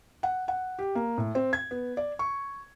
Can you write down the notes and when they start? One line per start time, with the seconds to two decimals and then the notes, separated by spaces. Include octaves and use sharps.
0.23 F#5
0.48 F#5
0.79 G4
0.95 A#3
1.18 A2
1.35 C4
1.53 G#6
1.71 B3
1.97 D5
2.19 C#6